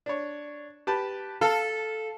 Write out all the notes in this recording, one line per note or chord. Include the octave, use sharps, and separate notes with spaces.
D4 C#5
G4 B4 A5
A4 F5